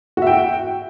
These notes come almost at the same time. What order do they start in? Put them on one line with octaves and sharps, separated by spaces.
F#4 E5 G5